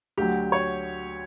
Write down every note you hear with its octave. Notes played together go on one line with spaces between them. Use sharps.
D2 D3 F#3 G4
C#5